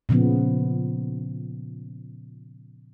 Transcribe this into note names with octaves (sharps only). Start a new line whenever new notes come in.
A#2 C#3 F3 B3